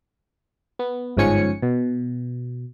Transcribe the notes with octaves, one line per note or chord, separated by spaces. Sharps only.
B3
G1 G#2 F3 C#4 G#5 C#7
B2